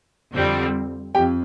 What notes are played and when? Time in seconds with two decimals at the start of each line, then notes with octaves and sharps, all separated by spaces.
0.33 F2 D3 G3 C4
1.15 F2 G4 G5